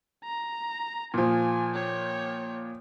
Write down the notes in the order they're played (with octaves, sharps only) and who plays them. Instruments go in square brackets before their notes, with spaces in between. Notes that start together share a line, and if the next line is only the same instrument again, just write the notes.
[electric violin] A#5
[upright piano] A#2 F3 [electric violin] G#5
[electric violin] C#5 G5